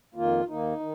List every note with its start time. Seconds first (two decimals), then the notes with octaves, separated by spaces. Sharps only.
0.15 F2 D#3 A#3 F4
0.47 D#2 D#3 A#3 D#4
0.80 D#3